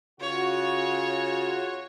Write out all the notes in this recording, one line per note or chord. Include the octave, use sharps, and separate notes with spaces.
C#3 F4 F#4 C#5